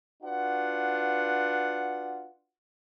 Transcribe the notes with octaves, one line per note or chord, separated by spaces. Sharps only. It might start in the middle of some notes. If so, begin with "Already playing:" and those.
D4 F4 F#4 B4 F#5